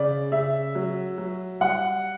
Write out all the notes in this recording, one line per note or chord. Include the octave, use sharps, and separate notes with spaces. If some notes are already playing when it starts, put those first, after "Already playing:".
Already playing: C#3 D5
C#3 E5
F#3
F#3
G3 F#5